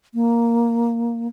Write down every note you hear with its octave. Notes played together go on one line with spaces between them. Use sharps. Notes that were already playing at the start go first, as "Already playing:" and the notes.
A#3